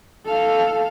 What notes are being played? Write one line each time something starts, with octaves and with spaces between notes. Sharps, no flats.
A4 F5